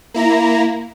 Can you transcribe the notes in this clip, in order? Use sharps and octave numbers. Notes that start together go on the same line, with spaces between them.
A#3 E4 A#5